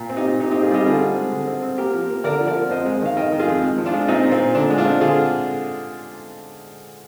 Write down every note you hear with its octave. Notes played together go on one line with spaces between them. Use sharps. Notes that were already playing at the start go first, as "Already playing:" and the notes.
Already playing: A#2
C4
D#4 G4
A#2
C4 D#4 G4
D#4 G4
C4
F4 G#4
G3 D#4 G4
D3 F4 G#4
C4
G#3
D3
C4
C4
A#3 G4 A#4
F3
A#3
D3 A#4 D5
F3
A#4 D5
F3
F2 C5 D#5
G#3
D#3 F5
D#3 D#5 G5
D#3
F4 G#4
F2
G#3
F3
D4 F4
G#3
A#2 C4 D#4
A#2
C4
A#2
D3 D4
G#3
D4 F4
C4
D3 F4 G#4